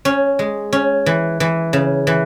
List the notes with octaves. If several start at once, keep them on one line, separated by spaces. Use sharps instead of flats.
C#4
G#3
C#4
E3
E3
C#3
E3